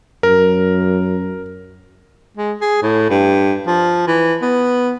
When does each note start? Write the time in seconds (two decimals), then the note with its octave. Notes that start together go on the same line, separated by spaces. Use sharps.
0.23 F#2 A#4
2.37 G#3
2.62 G#4
2.82 A2
3.10 G2
3.67 F3
4.08 E3
4.42 B3